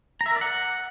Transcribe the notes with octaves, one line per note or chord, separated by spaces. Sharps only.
A#5
E5
A#4
D5
F#5